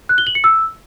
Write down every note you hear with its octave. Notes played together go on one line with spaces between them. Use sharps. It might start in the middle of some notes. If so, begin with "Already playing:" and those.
F#6
G7
F#7
C#7
E6